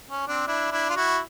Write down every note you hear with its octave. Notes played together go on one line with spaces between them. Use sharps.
C#4
C4 D4
D4 E4
D4 E4
F4
E4 F#4